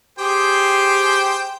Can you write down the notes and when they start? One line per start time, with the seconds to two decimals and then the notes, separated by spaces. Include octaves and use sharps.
0.19 G4 G#4 C5 G5